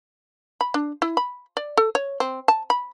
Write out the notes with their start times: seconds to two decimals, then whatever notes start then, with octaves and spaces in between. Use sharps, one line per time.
0.61 B5
0.74 D4
1.02 E4
1.17 B5
1.57 D5
1.77 A4
1.95 C#5
2.20 C4
2.48 A5
2.70 B5